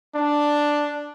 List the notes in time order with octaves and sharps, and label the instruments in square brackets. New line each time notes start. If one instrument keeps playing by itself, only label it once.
[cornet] D4